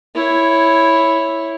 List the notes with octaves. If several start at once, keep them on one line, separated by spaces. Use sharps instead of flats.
E4 C#5